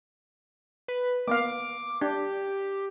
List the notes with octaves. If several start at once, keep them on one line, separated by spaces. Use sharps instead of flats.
B4
A#3 B3 F5 D6
D4 G4